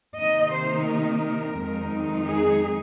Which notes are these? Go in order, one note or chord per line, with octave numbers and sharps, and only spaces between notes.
C3 D#3 A#3 D#4 D#5
C5
A#4
F2 D#3 G#3 C4 D#4
G#4